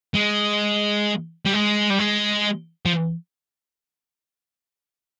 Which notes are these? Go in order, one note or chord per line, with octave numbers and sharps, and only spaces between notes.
G#3
G3
G#3
G3
G#3
F3